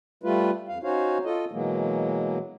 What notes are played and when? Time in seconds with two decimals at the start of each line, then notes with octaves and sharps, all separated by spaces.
0.23 G3 A3 F4 B4
0.69 F2 F5
0.84 C#4 D#4 F#4 C5 C#5 F5
1.25 F4 A4 D#5
1.52 B2 E3 F#3 G#3 A#3